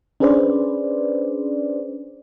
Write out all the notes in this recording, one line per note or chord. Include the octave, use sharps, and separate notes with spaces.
C#4 D4 G#4 B4 C5 D5